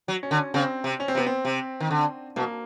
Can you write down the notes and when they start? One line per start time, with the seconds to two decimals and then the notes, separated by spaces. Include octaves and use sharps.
0.08 F#3
0.23 C#4
0.31 D3
0.54 C#3 C4
0.84 C3
1.00 C#4
1.08 C4
1.15 C3 B3
1.26 C4
1.45 C3
1.80 D#3
1.91 D3
2.36 B2 A#3